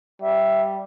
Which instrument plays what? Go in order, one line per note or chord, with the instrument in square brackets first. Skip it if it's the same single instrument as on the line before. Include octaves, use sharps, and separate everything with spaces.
[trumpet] G3 [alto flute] E5